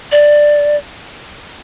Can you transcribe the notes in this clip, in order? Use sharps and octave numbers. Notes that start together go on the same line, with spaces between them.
D5